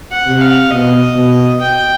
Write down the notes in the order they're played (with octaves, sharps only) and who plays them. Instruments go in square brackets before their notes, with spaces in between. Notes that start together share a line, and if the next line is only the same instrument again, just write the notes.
[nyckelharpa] F#5
[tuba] C3
[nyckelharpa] F5
[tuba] B2 [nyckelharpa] D#5
[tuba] B2
[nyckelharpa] G5